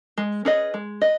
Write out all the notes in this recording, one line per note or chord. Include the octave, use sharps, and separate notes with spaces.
G#3
C#4 G#4 B4 D#5
G#3
B4 D#5